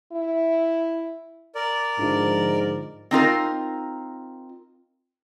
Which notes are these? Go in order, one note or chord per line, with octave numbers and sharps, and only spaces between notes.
E4
A#4 D5
G#2 D3 F3
C4 D#4 F4 A#4